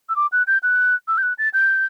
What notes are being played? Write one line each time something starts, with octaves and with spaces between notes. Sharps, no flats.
E6
D6
F#6
G6
F#6
E6
G6
F#6
A6
G6